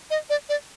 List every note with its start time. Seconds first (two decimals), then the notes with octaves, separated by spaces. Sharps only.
0.10 D#5
0.30 D5
0.49 D5